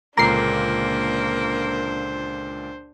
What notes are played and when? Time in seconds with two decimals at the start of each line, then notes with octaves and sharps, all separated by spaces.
0.17 C#2 A#2 D3 A#3 D4 C5 A#5 C7